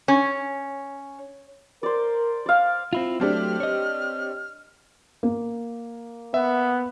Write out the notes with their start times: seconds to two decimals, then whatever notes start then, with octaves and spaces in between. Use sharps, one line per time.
0.08 C#4
1.83 A#4 C5 D5
2.46 D5 F5
2.93 C4 E4 F4 F5
3.20 F#3 A3 C4 D4 G4 F6
3.60 C#5 D#5
5.23 A#3
6.34 B3 E5